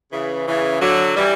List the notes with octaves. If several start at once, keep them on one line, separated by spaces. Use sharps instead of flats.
C#3 E3
C#3 E3
D3 F#3
E3 G3